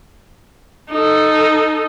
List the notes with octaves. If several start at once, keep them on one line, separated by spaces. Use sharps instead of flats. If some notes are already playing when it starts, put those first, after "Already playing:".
D#4 A4